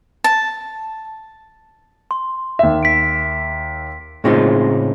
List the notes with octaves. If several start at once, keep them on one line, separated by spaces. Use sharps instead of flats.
A5
C6
D#2 E5
B6 D7
A2 C#3 G#3 C4 D#4 F4